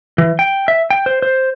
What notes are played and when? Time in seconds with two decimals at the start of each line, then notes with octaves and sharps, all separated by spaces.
0.18 E3
0.39 G5
0.68 E5
0.90 G5
1.06 C5
1.22 C5